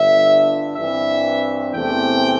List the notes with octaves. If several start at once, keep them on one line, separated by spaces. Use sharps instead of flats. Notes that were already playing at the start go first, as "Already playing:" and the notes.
Already playing: G1 G2 D3 E5
G2 E3 C4 E5
E2 C3 E3 A3 C4 G5